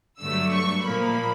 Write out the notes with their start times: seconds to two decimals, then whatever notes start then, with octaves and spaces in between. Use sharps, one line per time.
0.20 G2 D3 F#3 A3 E6
0.53 C#6
0.85 A#2 F3 A#3 B5